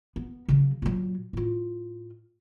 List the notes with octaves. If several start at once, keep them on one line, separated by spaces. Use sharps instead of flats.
B3
C#3 F#3
A#2 F#3
A2 F4